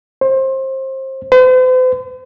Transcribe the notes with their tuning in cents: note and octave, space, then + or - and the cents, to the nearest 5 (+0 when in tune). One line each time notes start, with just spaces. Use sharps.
C5 +25
C5 -45